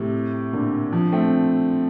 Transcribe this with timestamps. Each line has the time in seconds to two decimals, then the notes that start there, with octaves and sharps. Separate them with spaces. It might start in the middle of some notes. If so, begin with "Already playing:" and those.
Already playing: A2 C3
0.53 A#2 D3
0.92 D3 F3
1.12 A3 C4